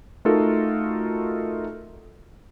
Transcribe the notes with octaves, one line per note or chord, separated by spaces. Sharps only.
A3 D#4 F4 F#4 A4 A#4